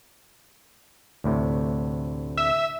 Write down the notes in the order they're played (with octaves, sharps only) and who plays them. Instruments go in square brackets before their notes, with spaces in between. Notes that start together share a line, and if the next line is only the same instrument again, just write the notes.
[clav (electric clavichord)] D2 A2 C3
[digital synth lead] E5